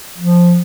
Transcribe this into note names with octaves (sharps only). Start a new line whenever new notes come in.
F3